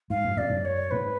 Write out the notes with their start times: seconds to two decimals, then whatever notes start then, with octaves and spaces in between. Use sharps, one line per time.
0.10 G#2 F5
0.25 F#2
0.37 F2 D5
0.50 F#2
0.65 C#5
0.91 G#2 B4